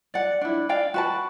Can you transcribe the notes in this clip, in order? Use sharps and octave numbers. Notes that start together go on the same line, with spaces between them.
D5 F#5
D4 E4
D5 F5 G5
F#4 B4 A5